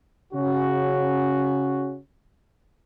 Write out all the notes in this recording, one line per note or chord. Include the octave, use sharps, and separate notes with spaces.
C#3 C#4 F#4